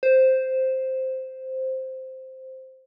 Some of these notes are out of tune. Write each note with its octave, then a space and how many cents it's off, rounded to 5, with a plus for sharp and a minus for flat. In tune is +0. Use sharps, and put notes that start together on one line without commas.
C5 +0